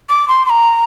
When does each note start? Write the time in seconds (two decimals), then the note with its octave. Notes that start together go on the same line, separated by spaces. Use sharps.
0.09 D6
0.28 C6
0.46 C6
0.50 A#5